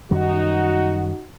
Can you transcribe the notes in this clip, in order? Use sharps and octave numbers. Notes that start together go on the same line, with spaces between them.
F#2 D#3 G3 D#4 F#4